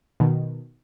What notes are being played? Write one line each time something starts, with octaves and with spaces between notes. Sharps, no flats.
B2 D#3